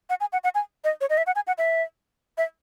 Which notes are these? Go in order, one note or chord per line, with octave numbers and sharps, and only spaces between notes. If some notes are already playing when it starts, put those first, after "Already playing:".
F#5
G#5
F#5
F#5
G#5
D#5
C#5
D#5
E5
F#5
G#5
F#5
E5
E5